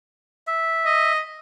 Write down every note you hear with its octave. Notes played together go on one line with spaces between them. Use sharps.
E5
D#5